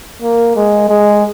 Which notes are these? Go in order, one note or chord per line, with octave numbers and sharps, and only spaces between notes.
A#3
G#3
G#3